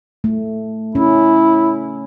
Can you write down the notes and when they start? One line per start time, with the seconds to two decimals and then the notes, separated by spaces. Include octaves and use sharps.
0.24 A3
0.95 C#4 E4